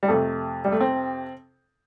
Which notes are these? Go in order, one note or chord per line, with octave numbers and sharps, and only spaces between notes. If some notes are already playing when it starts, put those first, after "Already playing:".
G3
F2 C3 A3
G3
A3
C4